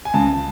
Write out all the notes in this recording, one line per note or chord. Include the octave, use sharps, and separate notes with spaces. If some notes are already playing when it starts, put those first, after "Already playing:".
G#5
C#2 A5